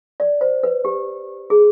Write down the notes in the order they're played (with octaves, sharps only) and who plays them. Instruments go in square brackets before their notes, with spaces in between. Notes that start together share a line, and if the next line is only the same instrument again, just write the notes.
[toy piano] D5
C5
B4
G4
G#4